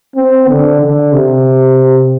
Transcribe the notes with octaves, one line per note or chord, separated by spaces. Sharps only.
C4
D3
D3
C3